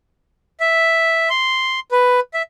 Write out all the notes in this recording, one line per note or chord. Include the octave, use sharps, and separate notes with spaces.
E5
C6
B4
E5